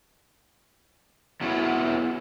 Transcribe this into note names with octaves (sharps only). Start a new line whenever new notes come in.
E2 F#3